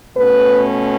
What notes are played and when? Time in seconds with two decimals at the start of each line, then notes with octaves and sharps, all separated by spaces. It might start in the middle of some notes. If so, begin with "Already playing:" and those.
0.17 B2 A3 C#4 B4